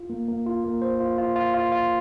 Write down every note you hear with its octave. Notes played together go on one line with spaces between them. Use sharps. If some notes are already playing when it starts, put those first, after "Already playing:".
Already playing: F4
A#3
A#3
F4
A#3
C5
F4
F4
F4
F4
F4